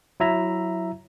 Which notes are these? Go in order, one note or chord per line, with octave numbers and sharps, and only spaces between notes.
F#3 E4 E5 A#5